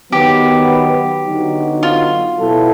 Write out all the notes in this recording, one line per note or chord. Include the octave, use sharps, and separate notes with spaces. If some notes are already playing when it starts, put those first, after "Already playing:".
D#3 F#3 B3 G4
D3 F#3 B3 D#4 F#4
F4
B2 F#3 B3 E4 A4